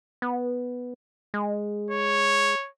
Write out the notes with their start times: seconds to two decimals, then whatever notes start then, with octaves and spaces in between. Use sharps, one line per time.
0.22 B3
1.34 G#3
1.91 C#5